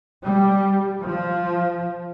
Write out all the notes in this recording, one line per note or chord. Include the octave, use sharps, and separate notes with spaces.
G3
F3